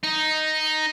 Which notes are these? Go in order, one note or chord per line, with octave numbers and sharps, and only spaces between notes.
D#4